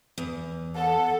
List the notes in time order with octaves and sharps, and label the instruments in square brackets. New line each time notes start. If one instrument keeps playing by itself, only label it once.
[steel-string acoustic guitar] E2
[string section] A4 [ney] F#5